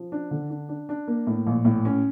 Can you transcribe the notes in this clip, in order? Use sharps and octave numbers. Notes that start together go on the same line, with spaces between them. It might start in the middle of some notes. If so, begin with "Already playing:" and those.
Already playing: F3
D4
D3
D4
D4
D4
A#3
A2
A#1
A2
C#4